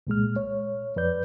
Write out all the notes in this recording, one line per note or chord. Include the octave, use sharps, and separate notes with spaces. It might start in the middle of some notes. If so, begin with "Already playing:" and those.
C2 A#2 G#3 F6
C#5
F2 B4 D5 G6